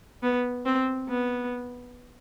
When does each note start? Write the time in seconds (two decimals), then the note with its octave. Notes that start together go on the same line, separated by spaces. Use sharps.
0.23 B3
0.66 C4
1.09 B3